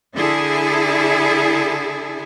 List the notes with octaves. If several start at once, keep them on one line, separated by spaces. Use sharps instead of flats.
D3 E4 G#4 A4